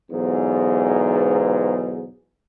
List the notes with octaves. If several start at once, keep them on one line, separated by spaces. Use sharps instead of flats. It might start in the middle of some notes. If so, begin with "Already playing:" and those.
B1 E2 G#2